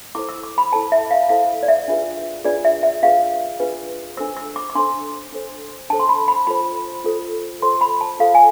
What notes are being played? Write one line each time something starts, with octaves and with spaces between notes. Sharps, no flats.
E4 A4 C5 D6
E6
D6
B5
E4 A4 C5 A5
E5
F5
E4 A4 C5 F5
D5
E5
D4 F4 G#4 B4
D4 F4 G#4 B4 D5
E5
E5
D4 F4 G#4 B4 F5
D4 F4 G#4 B4
D4 A4 C5 E6
E6
D6
D6
D4 A4 C5 C6
D4 A4 C5
D4 A4 C5 A5
C6
B5
B5
F4 A4 C5 B5
F4 A4 C5
F4 A4 C5 C6
B5
A5
F4 A4 C5 F5
G#5